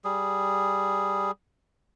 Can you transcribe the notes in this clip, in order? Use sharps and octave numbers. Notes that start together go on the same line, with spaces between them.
G3 G#4